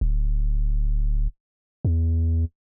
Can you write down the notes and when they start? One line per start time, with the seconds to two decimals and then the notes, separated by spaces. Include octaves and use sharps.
0.01 D1
1.85 E2